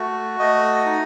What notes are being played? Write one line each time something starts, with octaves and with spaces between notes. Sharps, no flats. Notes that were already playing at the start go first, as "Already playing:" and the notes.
Already playing: A3 F#4
A3 D#5
D#4